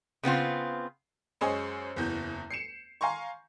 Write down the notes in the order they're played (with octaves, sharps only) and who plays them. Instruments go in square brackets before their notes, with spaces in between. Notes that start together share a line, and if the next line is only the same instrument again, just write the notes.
[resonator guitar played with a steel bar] C#3 B3 C4 F4
[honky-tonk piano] F#2 G#3 C5 C#5 D#5 G#5
F#1 E2 G6
C7 C#7 E7
F5 G#5 A#5 C6 C#6